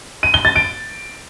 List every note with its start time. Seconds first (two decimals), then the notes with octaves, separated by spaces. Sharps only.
0.23 D#7
0.34 G7
0.45 A6
0.56 D7